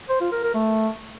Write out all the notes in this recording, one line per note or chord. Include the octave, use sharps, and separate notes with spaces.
C5
F4
A#4
A#4
A3